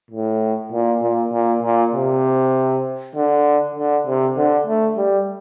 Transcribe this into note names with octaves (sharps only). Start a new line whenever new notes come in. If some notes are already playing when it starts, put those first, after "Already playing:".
A2
A#2
A#2
A#2
A#2
C3
D3
D3
C3
D3
A3
G3